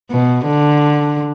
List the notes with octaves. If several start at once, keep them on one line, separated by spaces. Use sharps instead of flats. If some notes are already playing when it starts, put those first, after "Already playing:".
B2
D3